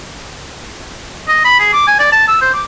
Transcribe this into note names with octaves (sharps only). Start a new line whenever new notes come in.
D#5
B5
G#4
D6
G#5
D5
A5
E6
C5
D6